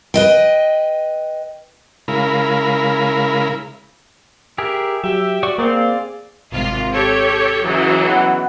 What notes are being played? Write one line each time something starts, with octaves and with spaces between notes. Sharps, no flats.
B4 D#5 G5
C#3 G#3 E4 A#4 F5 B5
G4 G#4 A#4 E5
F#3 G4 E5
F#4 D5 C#6
A#3 C4 G#4 D5 F5
G#1 C3 F4
G4 A4 C#5
C#3 E3 F#3 D#4 G#4
B3 F#5